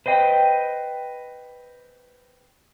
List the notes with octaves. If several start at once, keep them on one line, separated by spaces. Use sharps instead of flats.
B4 C5 D#5 G5